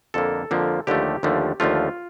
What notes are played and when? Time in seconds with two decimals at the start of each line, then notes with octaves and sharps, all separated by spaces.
0.14 F2 D3 F3 A#3 A4
0.51 F2 D3 F3 A#3
0.87 D#2 D3 F3 A3 G4
1.23 D#2 D3 F3 A3
1.60 D#2 D3 F3 A3 F4